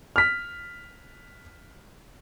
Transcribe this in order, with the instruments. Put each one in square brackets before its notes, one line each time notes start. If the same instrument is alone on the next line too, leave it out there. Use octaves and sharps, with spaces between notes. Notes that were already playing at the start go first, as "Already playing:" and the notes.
[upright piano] F6 B6